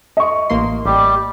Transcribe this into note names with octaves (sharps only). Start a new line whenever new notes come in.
D#5 C#6
A1 A#3 C6
A1 G3 G4